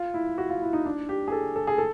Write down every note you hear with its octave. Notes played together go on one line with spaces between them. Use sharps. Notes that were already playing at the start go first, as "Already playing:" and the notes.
Already playing: F4
E4
F#4
F4
E4
D#4
D4
G4
G#4
A4
A4
G#4
A4